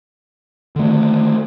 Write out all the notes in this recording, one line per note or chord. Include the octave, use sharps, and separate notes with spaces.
D3 D#3 A3